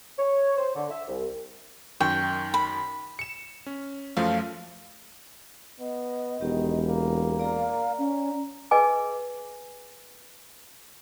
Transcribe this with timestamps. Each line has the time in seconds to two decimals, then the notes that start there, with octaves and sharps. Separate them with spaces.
0.19 C#5
0.57 C5
0.76 D3
0.91 E5
1.08 C2
2.00 F#2 D#3 G5 C#6
2.54 B5
3.19 C#7 E7
3.66 C#4
4.17 F#2 F3 A3 F5
5.80 B3 D#5
6.41 E1 D#3 B3 G4
6.87 A#3
7.40 D5 F5 A#5
7.99 C#4
8.71 G#4 B4 D#5 G#5 D6